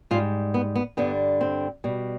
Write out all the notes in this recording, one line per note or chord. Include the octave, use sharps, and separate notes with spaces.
G#2 G3 F4
B3
B3
G2 D3 G3 B3
C4
B2 G3